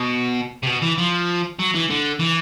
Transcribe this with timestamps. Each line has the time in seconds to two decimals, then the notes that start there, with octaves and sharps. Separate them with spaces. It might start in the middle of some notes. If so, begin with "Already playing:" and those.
Already playing: B2
0.63 C3
0.67 B2
0.82 E3
0.98 F3
1.59 F#3
1.75 E3
1.90 D3
2.19 E3